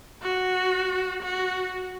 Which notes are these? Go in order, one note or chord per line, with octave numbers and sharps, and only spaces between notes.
F#4
F#4